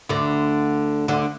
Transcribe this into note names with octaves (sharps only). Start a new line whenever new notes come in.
D2 D3
D2 D3